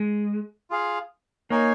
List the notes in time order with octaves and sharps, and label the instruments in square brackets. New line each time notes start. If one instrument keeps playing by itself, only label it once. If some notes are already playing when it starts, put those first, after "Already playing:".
Already playing: [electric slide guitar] G#3
[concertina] F4 G#4 F5
[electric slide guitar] A#3 [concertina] D#4 C#5 G#5